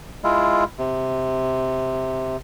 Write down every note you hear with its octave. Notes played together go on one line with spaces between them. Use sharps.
G#3 E4 F4
C3